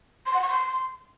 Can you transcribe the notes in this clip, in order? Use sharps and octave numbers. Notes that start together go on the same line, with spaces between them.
C6
F#5
C#6
C6